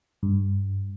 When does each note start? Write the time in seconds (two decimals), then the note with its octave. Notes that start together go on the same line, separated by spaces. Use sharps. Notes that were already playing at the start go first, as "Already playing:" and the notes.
0.23 G2